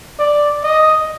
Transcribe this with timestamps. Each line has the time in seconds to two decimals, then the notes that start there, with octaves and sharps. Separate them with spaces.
0.19 D5
0.64 D#5